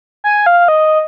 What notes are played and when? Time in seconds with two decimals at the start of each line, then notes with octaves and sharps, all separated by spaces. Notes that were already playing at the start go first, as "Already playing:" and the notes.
0.24 G#5
0.46 F5
0.68 D#5